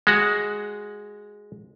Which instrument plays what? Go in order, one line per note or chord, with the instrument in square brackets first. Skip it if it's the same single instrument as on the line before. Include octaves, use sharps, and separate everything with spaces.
[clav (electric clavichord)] G#3 F#4